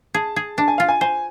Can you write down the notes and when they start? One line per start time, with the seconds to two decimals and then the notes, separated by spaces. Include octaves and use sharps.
0.14 G#4 A5
0.36 G#4
0.58 D4 A5
0.68 G#5
0.78 F4 F5
0.89 G#5
1.01 C5 G#5